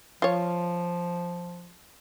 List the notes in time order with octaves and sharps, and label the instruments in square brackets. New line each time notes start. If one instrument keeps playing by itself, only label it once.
[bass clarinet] F3 [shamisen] F4 C#5